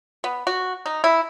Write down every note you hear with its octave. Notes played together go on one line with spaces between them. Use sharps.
B3
F#4
D#4
E4